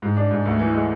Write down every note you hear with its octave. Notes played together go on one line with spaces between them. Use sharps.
G#2
D4
G#2
D2
E3
G#3